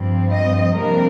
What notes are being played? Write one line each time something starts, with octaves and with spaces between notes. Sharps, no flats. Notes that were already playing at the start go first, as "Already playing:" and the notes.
Already playing: G2 F3 C4
D#5
F2 C3 G3 A#3 D4 A#4